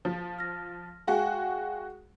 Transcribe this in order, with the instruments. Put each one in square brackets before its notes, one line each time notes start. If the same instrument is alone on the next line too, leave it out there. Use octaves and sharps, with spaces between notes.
[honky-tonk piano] F3
[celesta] F6 A#6
[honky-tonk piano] G#3 F#4 [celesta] F5 G5 G#5